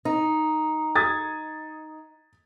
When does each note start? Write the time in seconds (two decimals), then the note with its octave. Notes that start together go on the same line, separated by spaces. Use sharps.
0.05 D#4
0.96 D#6 G#6 A6